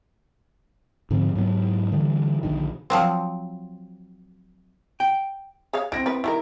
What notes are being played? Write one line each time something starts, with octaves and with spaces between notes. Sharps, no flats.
G#2 D3 F3 C4
G#2 F#3 A3 B3
D3 E3 G3
A#1 D3 D#3
F3 F#3 C4
G5
G#4 C#5 F5
C4 E4 A#6 D7
B3 E4 B4
D#3 G3 E4 A#4